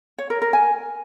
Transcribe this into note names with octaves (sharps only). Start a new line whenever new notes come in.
C#5
A#4
A#4
G#5